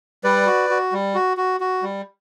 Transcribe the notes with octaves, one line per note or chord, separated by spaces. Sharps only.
G3 B4 D5
F#4
F#4
G3
F#4
F#4
F#4
G3